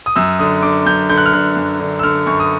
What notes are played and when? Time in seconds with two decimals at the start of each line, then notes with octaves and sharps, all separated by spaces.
0.06 D#6
0.16 F#2 E6
0.39 D3 D#6
0.63 D3 D6
0.86 F#2 G6
1.09 D3 G6
1.18 F#6
1.26 F6
1.33 D3 F#6
1.56 F#2
1.80 D3
1.99 E6
2.03 D3 F6
2.26 F#2 C#6
2.40 D#6